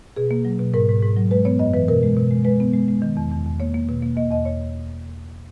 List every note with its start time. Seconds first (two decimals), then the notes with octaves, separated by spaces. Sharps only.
0.16 B2 G#4
0.31 A#3
0.45 F#3
0.59 B2
0.74 G#2 A#4
0.89 G#2
1.03 G#2
1.17 F#3
1.31 G#3 B4
1.45 B3 C#5
1.59 F#2 D#5
1.74 E3 B4
1.88 B2 A#4
2.03 G#3
2.17 B2
2.31 G#3
2.45 G#3 B4
2.60 B3
2.74 G#3
2.88 G#3
3.02 D#3
3.17 E2
3.31 E2
3.46 E2
3.60 A#3 C#5
3.74 A#3
3.89 B2
4.03 A#3
4.17 A#3 D#5
4.30 E2 D#5
4.45 C#5